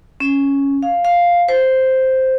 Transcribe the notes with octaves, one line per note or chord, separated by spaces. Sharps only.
C#4
F5
F5
C5